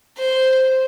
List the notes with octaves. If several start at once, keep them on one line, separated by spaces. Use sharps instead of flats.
C5